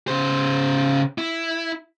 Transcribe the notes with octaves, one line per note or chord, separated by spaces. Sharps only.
C#3 C5
E4